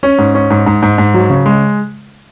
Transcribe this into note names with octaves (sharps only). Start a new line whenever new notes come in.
C#4
G#2
C#4
G#2
G#2
G#2
G#2
F#3
C#3
G#3